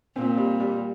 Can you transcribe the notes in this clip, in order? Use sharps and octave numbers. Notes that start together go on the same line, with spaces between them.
A#2 C4
G3
G3